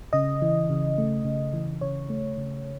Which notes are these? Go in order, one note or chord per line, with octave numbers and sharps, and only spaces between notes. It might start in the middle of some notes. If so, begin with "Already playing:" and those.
C#3 D#5
E3
C#3
A3
C#3
E3
C#3 C#5
A3
C#3